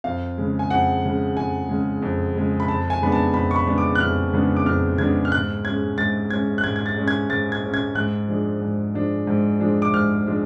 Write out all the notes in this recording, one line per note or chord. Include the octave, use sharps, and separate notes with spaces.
F2 F5
C#3 G#3
G#5
F2 F#5
C#3 G#3
F2 G#5
C#3 G#3
F2
C#3 G#3
B5
F2 A5
G#5
C#3 G#3 B3 D4 B5
A5
F2 B5
C#6
B5
C#3 G#3 B3 D4
D6
F#6
F2 F6
C#3 G#3 B3 D4
D6
F2 F6
C#3 G#3 B3 D4 G#6
F6
G#2 F#6
G#3 C#4 G#6
G#2 A6
G#3 C#4 G#6
F#6
G#2 G#6
G#6
A6
G#3 C#4
G#6
G#2 A6
G#6
G#3 C#4
G#6
G#2 F#6
F3 G#3 D4
G#2
F3 G#3 D4
G#2
F3 G#3 D4
D6
G#2 F6
F3 G#3 D4